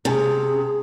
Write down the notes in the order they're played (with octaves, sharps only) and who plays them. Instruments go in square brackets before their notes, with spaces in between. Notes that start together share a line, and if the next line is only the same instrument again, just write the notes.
[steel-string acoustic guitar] C3 [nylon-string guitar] C#4 G#5 A5 [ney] G#4